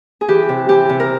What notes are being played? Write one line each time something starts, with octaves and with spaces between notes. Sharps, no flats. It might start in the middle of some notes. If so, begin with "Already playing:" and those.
G#4
E3 G4
C3
E3 G4
C3
A#4